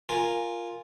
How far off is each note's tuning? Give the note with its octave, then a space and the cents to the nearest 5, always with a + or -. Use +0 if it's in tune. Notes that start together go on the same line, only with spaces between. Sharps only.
F4 +0 A#4 +0 G#5 +0